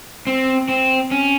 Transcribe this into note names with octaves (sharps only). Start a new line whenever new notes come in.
C4
C4
C#4